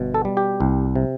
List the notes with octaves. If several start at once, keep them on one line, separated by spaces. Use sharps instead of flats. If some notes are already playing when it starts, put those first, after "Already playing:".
Already playing: G1 B2
A4
G3
G4
C2
C3